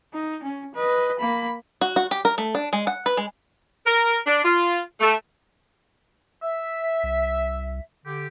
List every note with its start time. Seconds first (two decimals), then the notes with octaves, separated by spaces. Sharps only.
0.13 D#4
0.43 C#4
0.75 B4 D#5
1.19 A#3 B5
1.81 F#4
1.96 F#4
2.11 G4
2.25 A#4
2.38 A3
2.55 D4
2.73 G#3
2.87 F#5
3.06 B4
3.17 G#3
3.86 A#4
4.27 D4
4.45 F4
5.01 A3
6.42 E5
7.03 C2
8.06 D3 G4